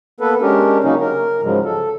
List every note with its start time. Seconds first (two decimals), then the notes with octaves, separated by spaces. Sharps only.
0.20 A#3 B3 A4 B4
0.42 G#3 C#4 D4 G4 A#4
0.84 C#3 F#3 A#3 C#4 D#4
1.00 A#4
1.42 G#2 C#3 F3 F#3 G#3
1.65 A4